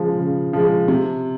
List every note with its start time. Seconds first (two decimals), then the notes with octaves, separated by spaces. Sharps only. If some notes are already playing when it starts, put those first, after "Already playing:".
Already playing: C#3 F3 G#3
0.19 C#3
0.53 F3 G#3
0.88 C3